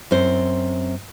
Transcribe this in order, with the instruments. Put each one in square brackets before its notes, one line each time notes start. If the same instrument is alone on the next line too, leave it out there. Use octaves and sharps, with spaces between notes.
[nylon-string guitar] F#2 C4 C5